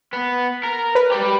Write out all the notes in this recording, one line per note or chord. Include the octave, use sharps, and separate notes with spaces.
B3
A#4
B4
G4 B5